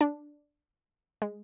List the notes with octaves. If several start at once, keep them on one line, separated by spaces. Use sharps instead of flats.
D4
G#3